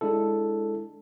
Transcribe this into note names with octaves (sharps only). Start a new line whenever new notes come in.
G#3 D4 E4 A4